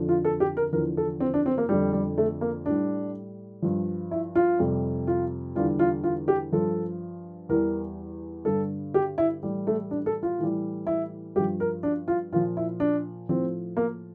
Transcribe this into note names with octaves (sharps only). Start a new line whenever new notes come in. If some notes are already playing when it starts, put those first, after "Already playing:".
Already playing: F2 D3 F3
F4
A4
G4
A#4
E2 D3 F3 A#4
A4
C4
D4
C4
A#3
F2 D3 G3
G3
A3
A#3
A2 G3 D4
G2 F3
E4
F4
F2 C3 G3
F4
E2 D3 G3 F4
F4
F4
G4
G2 F3 A4
E2 E3 G3 A#4
G2 D3 G3 A4
G4
E4
A2 E3 G3
A3
D4
A4
F4
A2 E3 G3
E4
G2 F3 G4
A#4
D4
F4
A#2 F3 F4
E4
D4
A2 F3 C4
A#3